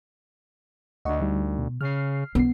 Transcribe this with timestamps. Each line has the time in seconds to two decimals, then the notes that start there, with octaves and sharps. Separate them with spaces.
1.05 D2 D#5 F#5 C#6
1.20 D3 G3 D#4
1.58 B2
1.81 C#3 F6 C7
2.35 B1 B3 C7